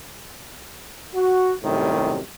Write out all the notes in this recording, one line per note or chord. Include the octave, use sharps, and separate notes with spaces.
F#4
F#2 A2 C3 D#3 G3